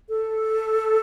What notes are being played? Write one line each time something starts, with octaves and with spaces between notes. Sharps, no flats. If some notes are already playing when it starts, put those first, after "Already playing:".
A4